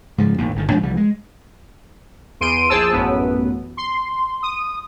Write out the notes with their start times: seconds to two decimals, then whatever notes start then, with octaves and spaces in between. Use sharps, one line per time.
0.18 G#2 C#3 F3
0.38 A1 D#2
0.55 G1 D3 D#3
0.69 G#2 F3 D4
0.83 C2 E3 F3 G3
0.97 G#3
2.40 E2 C6 D7 D#7
2.69 A#1 G#4 C5 A5 E6
2.92 A1 F#2 B3
3.77 C6
4.42 D#6